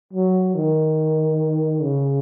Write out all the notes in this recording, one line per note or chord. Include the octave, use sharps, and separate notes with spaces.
F#3
D#3
C#3